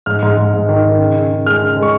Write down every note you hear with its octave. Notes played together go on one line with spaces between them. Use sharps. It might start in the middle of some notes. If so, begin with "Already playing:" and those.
G#2 F6
G#2
G#2
G#2
D#3
D#3
C#3
C#3
C#3
G#3 F6
C#3
G#3
C#6